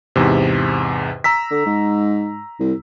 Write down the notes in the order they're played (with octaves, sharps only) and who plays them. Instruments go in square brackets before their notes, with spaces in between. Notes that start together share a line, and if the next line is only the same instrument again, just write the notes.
[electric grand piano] E2 G#2 C3
A#5 E6 B6
[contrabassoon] D3
G#2
C2